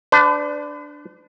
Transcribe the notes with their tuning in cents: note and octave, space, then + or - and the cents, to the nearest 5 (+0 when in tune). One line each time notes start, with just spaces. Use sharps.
D4 +0 B4 +45